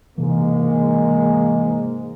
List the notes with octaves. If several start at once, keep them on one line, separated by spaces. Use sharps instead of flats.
G#2 C3 E3 G#3 A#3